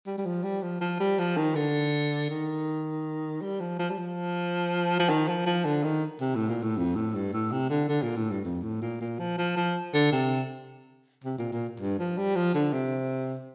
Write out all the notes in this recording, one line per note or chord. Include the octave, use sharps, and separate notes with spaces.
G3
G3
F3
G3
F3
F3
G3
F3
D#3
D3
D#3
G3
F3
F3
G3
F3
F3
D#3
F3
F3
D3
D#3
C3
A2
A#2
A2
F2
A2
G2
A2
C3
D3
D3
A#2
A2
G2
F2
A2
A#2
A#2
F3
F3
F3
D3
C3
C3
A#2
A#2
G2
F3
G3
F3
D3
C3